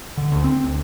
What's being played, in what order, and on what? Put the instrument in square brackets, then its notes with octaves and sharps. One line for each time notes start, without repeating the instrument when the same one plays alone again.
[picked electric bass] D3
D2
C4
D2